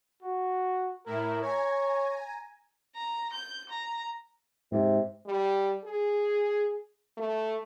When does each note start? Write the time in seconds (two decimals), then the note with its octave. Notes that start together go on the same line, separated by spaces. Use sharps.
0.22 F#4
1.06 A2 E4 A#4
1.42 C#5 G#5 A#5
2.95 A#5
3.33 G6
3.70 A#5
4.72 G#2 C3
5.26 G3
5.84 G#4
7.17 A3